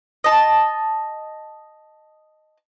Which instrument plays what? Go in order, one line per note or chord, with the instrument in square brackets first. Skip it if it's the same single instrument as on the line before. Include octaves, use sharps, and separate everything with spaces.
[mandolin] D#5 A5